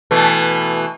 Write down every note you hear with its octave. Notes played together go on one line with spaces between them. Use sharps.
B2 E3 A3